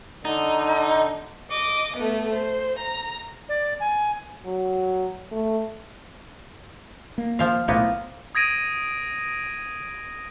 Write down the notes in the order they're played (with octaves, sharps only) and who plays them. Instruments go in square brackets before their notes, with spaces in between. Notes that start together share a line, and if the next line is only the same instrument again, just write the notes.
[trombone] D3 [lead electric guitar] D#4
[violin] D#5 D6
A3 B3
C5
A#5
[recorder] D5
G#5
[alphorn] F#3
A3
[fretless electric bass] A#3
[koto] F3 F5
[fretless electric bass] B1 A2 [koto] F3 A#3 B3
[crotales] D#6 G#6 A#6 D7 D#7